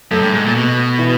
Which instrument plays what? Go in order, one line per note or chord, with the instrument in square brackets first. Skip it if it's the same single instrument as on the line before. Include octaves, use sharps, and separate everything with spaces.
[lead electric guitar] F#2 [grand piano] A3 A4
[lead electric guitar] G2
G#2
A#2
B2
[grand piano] E3 E4